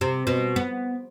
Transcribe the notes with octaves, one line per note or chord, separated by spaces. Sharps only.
C3
B2
B3